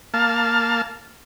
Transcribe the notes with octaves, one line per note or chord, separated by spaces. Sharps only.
A#3 F5 A5